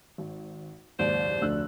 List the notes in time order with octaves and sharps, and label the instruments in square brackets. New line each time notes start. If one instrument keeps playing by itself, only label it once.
[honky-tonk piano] G#1
[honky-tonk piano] F#1 D#2 G#2 [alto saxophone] C5 [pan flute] D5
[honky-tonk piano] F1 E6 F#6 [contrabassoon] D2